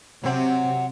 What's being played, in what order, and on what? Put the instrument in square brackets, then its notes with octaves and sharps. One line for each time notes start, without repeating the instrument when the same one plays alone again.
[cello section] C3 [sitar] F#3 C4